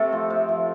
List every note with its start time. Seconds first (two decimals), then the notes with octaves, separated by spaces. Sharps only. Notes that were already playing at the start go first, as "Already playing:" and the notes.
Already playing: C3 A3 A4
0.13 F3
0.30 C3
0.49 F3